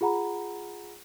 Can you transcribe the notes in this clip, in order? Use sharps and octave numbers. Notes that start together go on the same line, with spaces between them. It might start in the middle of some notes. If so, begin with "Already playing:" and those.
F4 G#4 F#5 A#5 B5